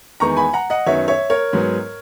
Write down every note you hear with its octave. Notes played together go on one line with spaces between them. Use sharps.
E2 D#3 G#3 B3 A#5 C#6
G#5 B5
F#5 A#5
D#5 F#5
F#2 D#3 F#3 B3 C#5 E5
C#5 E5
A#4 C#5
G#2 F#3 B3